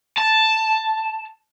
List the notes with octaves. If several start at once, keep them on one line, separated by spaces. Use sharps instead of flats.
A5